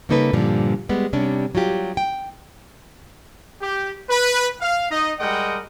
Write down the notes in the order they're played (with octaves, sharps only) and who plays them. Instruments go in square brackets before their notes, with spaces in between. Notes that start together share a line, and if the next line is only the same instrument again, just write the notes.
[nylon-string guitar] C#3 G3 A#3 D#4 A4 B4
G2 A#2 D3 F3 G3
G3 G#3 B3
C3 G3 C#4 D4
F#3 G3 F4 G4
G5
[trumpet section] G4
B4
F5
D#4 D#5
G3 G#3 A#4 D#5 F#5 G5